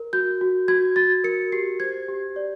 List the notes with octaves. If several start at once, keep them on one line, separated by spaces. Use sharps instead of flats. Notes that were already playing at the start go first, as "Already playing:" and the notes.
Already playing: A#4
F#4 G6
F#4
F#4 G#6
F#4 A6
A#4 C#7
G4 C7
C5 G#6
G4
D5